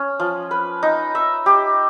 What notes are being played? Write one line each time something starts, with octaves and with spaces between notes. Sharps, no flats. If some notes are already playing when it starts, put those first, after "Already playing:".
Already playing: C#4
F3
B4
D#4
E5
G4